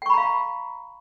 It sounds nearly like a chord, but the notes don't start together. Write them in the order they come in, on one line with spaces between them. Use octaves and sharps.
G5 C#6 B5 A#5 F5